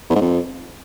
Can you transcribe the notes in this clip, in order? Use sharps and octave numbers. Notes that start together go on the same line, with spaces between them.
E2
G#2
F2